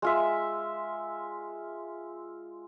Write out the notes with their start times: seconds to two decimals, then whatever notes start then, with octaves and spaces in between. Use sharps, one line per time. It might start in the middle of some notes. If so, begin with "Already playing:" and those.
0.02 G#3 F4 E5